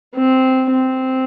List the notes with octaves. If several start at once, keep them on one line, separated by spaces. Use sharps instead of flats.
C4
C4